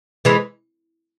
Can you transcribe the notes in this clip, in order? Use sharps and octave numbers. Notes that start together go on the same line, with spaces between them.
E3 G#3